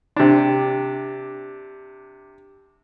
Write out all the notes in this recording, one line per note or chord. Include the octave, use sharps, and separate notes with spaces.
C3 D4